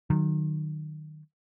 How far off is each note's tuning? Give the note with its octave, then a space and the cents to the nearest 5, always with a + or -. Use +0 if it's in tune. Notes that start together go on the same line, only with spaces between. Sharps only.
D#3 -25 F#3 +0